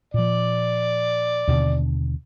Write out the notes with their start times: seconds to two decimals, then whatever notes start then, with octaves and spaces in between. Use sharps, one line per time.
0.14 A#2 F3 D5
1.48 D#2 B2 D3